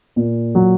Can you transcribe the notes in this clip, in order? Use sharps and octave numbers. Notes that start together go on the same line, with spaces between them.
A#2
F#3